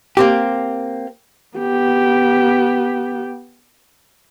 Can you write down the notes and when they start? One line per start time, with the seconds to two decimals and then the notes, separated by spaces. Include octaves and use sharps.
0.17 A#3 C4 G4
1.57 B3 G4